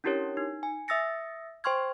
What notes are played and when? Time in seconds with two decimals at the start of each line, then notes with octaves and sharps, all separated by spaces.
0.04 C#4 D4 E4 G4 A#4 C#5
0.37 D#4
0.63 G#5
0.88 E5 D#6 E6 A6 A#6 C#7
1.64 C5 G5 C6 C#6 F6 G#6